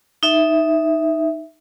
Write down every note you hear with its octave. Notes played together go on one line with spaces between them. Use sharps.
D#4 E5